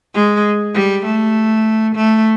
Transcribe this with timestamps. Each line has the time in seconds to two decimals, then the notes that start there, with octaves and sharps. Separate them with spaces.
0.14 G#3
0.74 G3
1.05 A3
1.95 A3